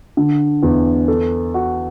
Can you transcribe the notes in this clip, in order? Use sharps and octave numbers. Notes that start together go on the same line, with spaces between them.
D3
E2
A4
F#4